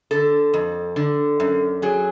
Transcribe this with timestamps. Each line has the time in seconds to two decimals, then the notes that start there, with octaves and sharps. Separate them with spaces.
0.11 D3 A4
0.54 F2
0.96 D3
1.40 F#2
1.82 F#3 G#4